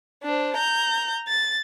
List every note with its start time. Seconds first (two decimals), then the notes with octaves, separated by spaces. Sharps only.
0.23 D4 C5
0.56 A#5 G6
1.28 A6